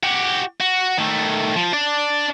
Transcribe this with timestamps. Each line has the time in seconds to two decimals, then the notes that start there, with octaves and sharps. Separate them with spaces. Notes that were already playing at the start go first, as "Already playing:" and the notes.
0.03 F#4 G4
0.60 F#4
0.98 D#3 A3
1.56 F3
1.73 D4 D5